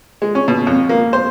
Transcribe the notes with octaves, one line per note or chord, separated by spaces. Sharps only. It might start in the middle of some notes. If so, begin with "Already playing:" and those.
G#3
C#4
B2
F2
A#3
C5